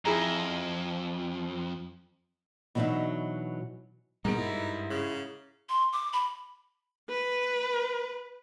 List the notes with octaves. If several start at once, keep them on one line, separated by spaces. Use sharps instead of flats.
F2 E4 G#4 A#5
B2 E3 F#3 D4 D#4 E5
G#2 B2 G3 B3 D#4 A#4 D7
G2 E4
C#3
C6
D6
B5
B4